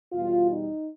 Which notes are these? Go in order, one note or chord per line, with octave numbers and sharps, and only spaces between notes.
E2 B2 G3 F4
D#4